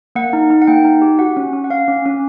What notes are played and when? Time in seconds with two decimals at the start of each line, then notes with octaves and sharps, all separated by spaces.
0.15 A#3 F#5
0.33 D#4
0.50 D#4
0.62 F#5
0.67 A#3 G5
0.84 D#4
1.02 G4
1.19 F#4 F#5
1.37 C#4
1.53 C#4
1.64 F#5
1.70 C#4 F5
1.88 C#4
2.06 C#4